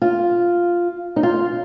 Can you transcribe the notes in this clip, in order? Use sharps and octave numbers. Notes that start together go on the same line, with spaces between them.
F4
D#4
F4